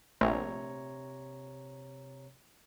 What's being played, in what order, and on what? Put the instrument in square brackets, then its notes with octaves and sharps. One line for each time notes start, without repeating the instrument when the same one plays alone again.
[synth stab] A#1 [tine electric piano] C3 C#5 A#5 [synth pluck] A3